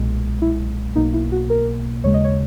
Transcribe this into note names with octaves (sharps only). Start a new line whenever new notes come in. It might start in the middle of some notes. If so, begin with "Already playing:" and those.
Already playing: B1 A#2 G#3
E4
B1 B2 A#3 D#4
E4
F#4
A#4
D#2 C#3 G#3 C#5
D#5
C#5